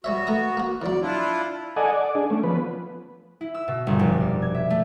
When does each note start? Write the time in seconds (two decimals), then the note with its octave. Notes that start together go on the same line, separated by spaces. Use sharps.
0.04 G3 B3 F#4 C#5 E5
0.27 A3 A#5 D#6
0.57 A#3 F#4
0.82 E2 F#3 D5
1.01 D4 E4 F4
1.76 A4 D5 D#5 F#5 G#5
1.94 D5
2.15 D4 G#4
2.30 A3 C#4
2.43 F3 B3 B4
3.41 E4
3.54 E6
3.68 B2
3.87 G1
3.99 F1
4.20 D5
4.42 G#6
4.55 E5
4.70 A3